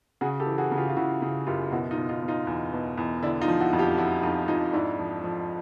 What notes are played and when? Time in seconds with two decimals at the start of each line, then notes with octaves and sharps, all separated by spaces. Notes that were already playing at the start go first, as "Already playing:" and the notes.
0.21 C#3 F#4 G#4
0.40 G4 A4
0.46 E3
0.58 F#4 G#4
0.71 C#3
0.78 F4 G4
0.89 F4
0.96 C#3 E4 F#4
1.22 C#3
1.46 F#2 F4 G4
1.72 B2 E4 F#4
1.91 D#4 F4
1.97 B2
2.09 D#4 F4
2.22 B2
2.28 D#4 F4
2.47 E2
2.73 B2
2.97 E2
3.22 D3 D4 E4
3.41 D#4 F4
3.48 F3
3.60 E4 F#4
3.73 F2
3.79 F4 G4
3.98 F3 E4 F#4
4.23 F2 D#4 F4
4.48 F2 D#4 F4
4.73 G#2 D4 E4
4.99 F3
5.24 F3